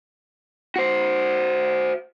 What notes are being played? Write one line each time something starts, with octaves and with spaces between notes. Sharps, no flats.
F#4 C5